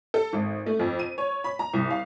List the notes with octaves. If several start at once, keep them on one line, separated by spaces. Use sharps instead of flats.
A4
G#1
A3
F2
D#7
C#5
B5
A#5
C2
F5